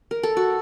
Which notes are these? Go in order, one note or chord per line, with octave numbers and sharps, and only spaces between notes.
A#4
A4
F#4